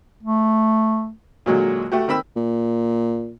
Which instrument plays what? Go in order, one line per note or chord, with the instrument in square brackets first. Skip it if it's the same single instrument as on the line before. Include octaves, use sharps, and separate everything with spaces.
[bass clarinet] A3
[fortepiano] A#2 D3 F#3 G#3 F#4
A3 F#4 G4
D#3 C4 B5 E6
[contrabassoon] A#2